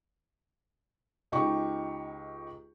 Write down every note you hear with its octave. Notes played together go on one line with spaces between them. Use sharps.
C#2 D#4 G4 C#6